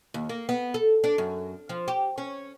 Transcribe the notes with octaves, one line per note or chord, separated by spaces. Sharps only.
D#2
A#3
B3
A4
D4
F#2
F3
G4
C#4